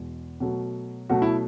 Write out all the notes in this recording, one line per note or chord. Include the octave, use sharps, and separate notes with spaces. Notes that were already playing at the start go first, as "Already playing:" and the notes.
Already playing: E2 B2 G#3
B2 F#3 A3
B2 F#3 A3 F#4
E4